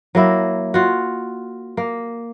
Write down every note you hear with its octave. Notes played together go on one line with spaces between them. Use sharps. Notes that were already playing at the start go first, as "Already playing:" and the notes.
F#3 A#3 E4
F4 F#4
A#3